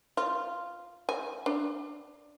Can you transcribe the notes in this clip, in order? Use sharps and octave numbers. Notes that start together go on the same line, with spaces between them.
F4
G#5
D4